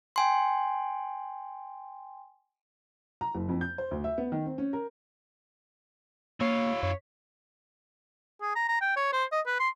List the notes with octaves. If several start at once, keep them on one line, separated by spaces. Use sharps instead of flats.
G5 G#5 C6
A#5
F#1
F2
G6
C5
D2
E5
B3
D#3
C4
C#4
A#4
A#3 E4 C#5 F5
F#2 C#5
G#4
A#5
A#5
G5
C#5
C5
D#5
B4
C6